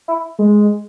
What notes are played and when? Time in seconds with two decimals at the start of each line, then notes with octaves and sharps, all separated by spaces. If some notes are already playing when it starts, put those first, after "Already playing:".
0.08 E4
0.39 G#3